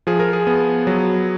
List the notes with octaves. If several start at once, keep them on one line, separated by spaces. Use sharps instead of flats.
F3 G#4
A#4
G#4
B3
F#3